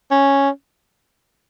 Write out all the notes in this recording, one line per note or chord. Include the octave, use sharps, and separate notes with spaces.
C#4